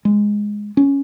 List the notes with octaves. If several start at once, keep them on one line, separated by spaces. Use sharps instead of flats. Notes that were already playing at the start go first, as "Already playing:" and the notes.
G#3
C#4